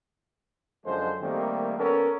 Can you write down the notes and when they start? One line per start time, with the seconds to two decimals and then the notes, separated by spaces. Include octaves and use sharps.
0.85 F#2 D3 F3 G#3 A4 C5
1.21 D#3 G3 A3 A#3 C4
1.78 B3 C#4 A4 A#4